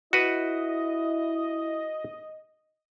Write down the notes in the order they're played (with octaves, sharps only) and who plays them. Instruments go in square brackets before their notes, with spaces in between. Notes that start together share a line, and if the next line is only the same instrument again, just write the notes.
[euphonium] E4 [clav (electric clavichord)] F#4 B4 [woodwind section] D#5